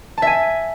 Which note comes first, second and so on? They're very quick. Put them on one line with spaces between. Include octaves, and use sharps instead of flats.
A5 E5 G#5